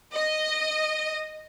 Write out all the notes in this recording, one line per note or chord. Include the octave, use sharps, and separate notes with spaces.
D#5